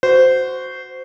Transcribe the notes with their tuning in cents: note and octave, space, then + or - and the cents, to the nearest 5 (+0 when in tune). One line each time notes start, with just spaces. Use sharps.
F#4 +0 C5 -15